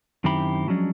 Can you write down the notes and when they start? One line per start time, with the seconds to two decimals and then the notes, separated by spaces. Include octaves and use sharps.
0.24 F#2 D#3 C4 E4 G4 B5
0.67 F3 F#3 G#3 C#4 D4